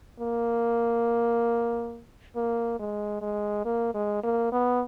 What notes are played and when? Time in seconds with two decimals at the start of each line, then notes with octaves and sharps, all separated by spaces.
0.20 A#3
2.36 A#3
2.79 G#3
3.21 G#3
3.65 A#3
3.94 G#3
4.23 A#3
4.52 B3